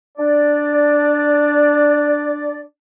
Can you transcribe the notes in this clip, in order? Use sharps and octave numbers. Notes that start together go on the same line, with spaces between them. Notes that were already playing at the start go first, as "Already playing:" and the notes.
D4 D5